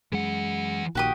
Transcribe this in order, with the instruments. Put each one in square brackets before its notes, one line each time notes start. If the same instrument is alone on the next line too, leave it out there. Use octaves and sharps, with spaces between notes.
[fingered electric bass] F#2 G#3 [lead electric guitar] E3 F#5
[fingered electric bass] A#1 A#2 D#3 [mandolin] F#4 G4 D#6